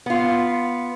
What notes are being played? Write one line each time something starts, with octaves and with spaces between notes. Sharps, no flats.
B3 F4